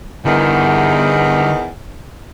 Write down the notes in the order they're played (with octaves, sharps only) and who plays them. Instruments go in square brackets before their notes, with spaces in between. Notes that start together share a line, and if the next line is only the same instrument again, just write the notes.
[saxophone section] E2 D#3 [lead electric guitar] D3 G3